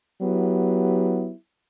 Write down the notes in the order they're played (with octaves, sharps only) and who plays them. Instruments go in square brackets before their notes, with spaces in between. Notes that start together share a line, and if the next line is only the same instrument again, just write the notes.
[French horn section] F#3 B3 E4 G4